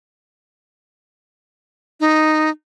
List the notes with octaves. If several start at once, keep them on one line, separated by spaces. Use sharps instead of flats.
D#4